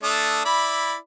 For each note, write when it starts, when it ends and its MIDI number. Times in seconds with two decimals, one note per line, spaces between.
0.03 0.44 57
0.03 0.44 62
0.03 0.44 87
0.45 0.96 64
0.45 0.96 74
0.45 0.96 83